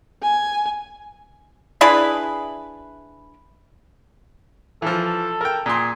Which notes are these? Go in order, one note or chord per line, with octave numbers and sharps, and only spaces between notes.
G#5
D4 E4 G#4 B4
E3 F3 A4
A#4 G5
A#2 G#4 C6